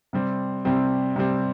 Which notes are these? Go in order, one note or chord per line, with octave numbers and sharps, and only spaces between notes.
C3 G3 C4
C3 G3 C4
C3 G3 C4